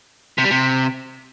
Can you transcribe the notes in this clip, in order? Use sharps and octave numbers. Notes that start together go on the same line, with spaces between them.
C3
G3
C3